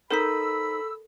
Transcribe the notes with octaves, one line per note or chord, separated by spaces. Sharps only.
D#4 A4 A#4 C5 B5 E6 B6